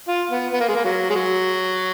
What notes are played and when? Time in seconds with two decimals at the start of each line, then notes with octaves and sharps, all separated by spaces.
0.08 F4
0.31 B3
0.54 B3
0.61 A#3
0.68 G#3
0.75 A#3
0.84 F#3
1.10 G#3
1.15 F#3